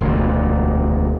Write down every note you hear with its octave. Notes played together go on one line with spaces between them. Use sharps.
E1 D2 A#2